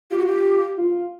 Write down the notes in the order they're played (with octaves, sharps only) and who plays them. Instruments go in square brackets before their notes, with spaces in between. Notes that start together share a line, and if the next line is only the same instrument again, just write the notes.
[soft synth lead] F4 [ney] G4
[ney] F#4
G4
[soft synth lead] F4